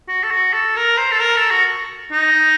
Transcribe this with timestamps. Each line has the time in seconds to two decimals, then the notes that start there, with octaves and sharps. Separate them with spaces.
0.08 F#4
0.24 A4
0.31 F#4
0.53 A4
0.76 A#4
0.98 C5
1.11 A4
1.21 A#4
1.36 A4
1.51 F#4
2.12 D#4